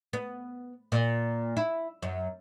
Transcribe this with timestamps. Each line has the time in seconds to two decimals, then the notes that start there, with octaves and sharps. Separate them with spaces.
0.13 B3
0.92 A#2
1.57 E4
2.02 F#2